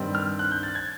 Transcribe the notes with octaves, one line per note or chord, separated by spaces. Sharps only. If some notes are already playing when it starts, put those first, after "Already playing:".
Already playing: G2 D#3 G3 C4
F6
F#6
G6
A6
G#6